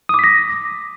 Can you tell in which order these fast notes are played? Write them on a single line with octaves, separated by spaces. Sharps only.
D#6 D6 B6 A#6